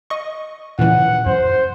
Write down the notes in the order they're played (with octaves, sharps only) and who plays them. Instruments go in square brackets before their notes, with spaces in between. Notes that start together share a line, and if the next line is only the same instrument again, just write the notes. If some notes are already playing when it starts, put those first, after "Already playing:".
[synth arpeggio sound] D#5 C#6
[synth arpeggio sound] A#2 C#3 E3 [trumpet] F#5
[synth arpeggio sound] F#2 [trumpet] C5